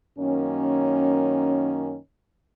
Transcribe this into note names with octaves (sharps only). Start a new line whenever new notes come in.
F#2 D#3 A#3 C#4